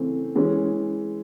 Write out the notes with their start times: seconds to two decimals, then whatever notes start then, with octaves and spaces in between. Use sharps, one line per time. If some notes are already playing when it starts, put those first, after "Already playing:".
Already playing: C#3 E3 A3 C4
0.35 E3 G#3 C#4